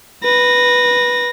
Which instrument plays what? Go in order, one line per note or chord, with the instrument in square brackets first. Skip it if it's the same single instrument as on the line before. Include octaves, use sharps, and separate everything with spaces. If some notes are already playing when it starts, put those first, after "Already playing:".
[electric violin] B4 A#6